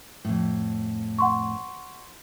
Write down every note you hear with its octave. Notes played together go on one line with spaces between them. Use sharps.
F2 A2
F#5 C6 C#6